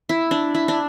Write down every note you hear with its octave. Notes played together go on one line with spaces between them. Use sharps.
E4
D4
E4
D4